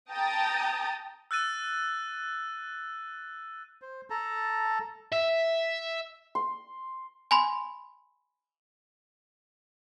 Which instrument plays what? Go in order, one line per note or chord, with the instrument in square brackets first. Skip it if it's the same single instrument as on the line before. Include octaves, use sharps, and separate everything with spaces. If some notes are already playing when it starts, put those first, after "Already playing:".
[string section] G5 A5 A#5 D#6 A6
[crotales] E6 F#6 A6 D#7
[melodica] C5
A4 A5 A#5
[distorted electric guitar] E5
[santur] C6
[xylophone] G#5 B5 C6